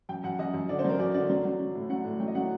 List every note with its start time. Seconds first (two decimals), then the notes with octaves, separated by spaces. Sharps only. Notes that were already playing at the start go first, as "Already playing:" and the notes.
0.09 F#2 G5
0.24 F#2 F#5
0.39 F#2 D#5
0.54 F#2
0.69 D3 D5
0.79 C5
0.84 F#3 A#4
0.99 F#2 D5
1.14 D3 D5
1.30 F#3
1.45 F#3
1.60 F#3
1.75 A2
1.90 F#3 F#5
2.05 A2
2.20 F#3 G5
2.27 D#5
2.35 F#3 F#5